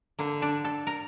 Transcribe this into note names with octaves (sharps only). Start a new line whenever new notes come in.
D3 A#3
D4
A4
A#4